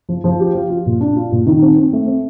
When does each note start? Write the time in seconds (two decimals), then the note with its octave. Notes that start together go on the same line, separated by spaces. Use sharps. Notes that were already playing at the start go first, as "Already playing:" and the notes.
0.09 F3
0.24 F3
0.40 G4
0.55 F4
0.70 F4
0.86 A#2
1.01 D4
1.16 F4
1.32 A#2
1.46 D#3
1.62 C4
1.77 C4
1.93 A3
2.08 C4